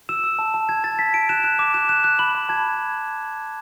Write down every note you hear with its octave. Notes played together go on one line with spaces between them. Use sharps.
E6 E7
E6
A5
A5
A5 G#6
A5 A6
A5 B6
A5 D7
F#6 E7
F#6 E7
D6 E7
F#6 E7
F#6 E7
F#6
B5 F#7
B5
A5 G#6